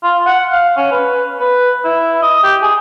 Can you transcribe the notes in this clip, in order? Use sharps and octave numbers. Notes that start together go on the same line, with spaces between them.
F4
F#5
F5
C#4
B4
B4
E4
D#5
G4
G#4